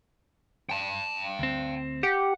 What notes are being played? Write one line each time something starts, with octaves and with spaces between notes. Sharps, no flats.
G5 A5
D2 C4
G4 F#5